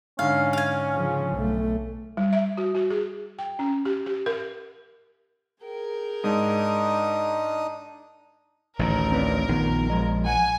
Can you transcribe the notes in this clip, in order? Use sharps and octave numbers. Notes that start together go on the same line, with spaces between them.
G#2 D3 C#4 F5
F5 G#5
C#3 F3
B1 A3
G3
E5
F#4
F#4
G#4
G5
C#4
G4
G4
A#4
G#4 A#4 G5
G#2 D4 D#4 D#6
A1 D2 D#3 A#4
C4 B4 D5
A#1 D#3 B3 D#4
F3 G#3 D#5
F#5 G#5